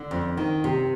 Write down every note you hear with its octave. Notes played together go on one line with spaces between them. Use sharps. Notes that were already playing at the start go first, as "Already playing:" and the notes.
Already playing: D3
F2
D#3
C3